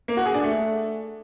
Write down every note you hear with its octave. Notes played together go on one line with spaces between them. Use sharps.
A#3
F#4
G#4
D4
A3